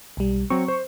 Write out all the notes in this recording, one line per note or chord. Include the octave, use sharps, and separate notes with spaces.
B1 G3
F#3 C4 C#6
C5